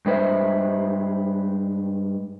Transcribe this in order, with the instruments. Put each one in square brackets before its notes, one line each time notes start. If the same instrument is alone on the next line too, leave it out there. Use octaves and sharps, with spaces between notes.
[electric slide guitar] G2 G#3 B4 C5 E5